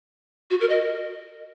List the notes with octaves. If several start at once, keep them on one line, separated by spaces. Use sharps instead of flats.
F#4
A#4
D#5